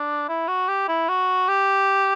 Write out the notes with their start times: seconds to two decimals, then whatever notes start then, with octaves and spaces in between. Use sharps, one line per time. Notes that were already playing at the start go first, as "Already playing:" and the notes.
Already playing: D4
0.28 E4
0.48 F#4
0.68 G4
0.88 E4
1.09 F#4
1.48 G4